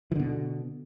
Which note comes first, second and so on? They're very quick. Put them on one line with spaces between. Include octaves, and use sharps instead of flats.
E3 D3 B2